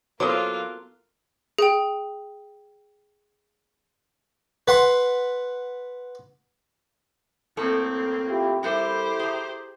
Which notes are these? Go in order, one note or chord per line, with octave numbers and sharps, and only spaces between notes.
F#3 A#3 B3 E4 F4 A4 C5 D6
G#4 G5
B4 F#5 C6
F#2 A2 A#3 C4 A4
E4 F4 G4
G3 E4 G4 A4 A#4 C5
G#4 A#5